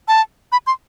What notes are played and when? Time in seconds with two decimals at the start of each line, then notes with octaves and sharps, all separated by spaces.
0.08 A5
0.52 B5
0.67 C6